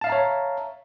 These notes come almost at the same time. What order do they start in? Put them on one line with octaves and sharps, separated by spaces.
A5 F5 E5 A#5 C#5